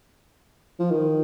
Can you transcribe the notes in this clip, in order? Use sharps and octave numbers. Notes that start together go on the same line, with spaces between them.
F3
D#3